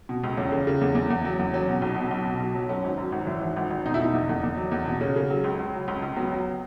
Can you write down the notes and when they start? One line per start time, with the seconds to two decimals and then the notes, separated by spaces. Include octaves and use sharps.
0.09 B2
0.24 C#2
0.37 E2 C#4
0.52 C#3
0.67 C#3
0.81 E2
0.95 E2
1.10 E2
1.25 F#3
1.39 E2
1.53 F#3 C#4
1.68 B2
1.82 B1
1.96 B2
2.11 B1
2.26 B2
2.40 B1
2.55 F#3
2.69 F#2 C#4
2.84 G#1
2.98 F#2
3.12 G#1
3.27 E3
3.41 G#1
3.56 G#1
3.70 G#1
3.86 B2 D#4
3.94 E4
4.00 B2 D#4
4.14 E2
4.29 E2
4.43 E2
4.57 F#3
4.71 E2
4.86 B2
5.01 C#3 C#4
5.16 C#3
5.30 F#3
5.44 C#2
5.59 C#2
5.73 F#3
5.88 C#2
6.02 C#2
6.16 F#3 B3
6.32 F#3